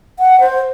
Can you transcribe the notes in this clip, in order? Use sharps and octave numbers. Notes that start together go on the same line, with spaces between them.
F#5
C5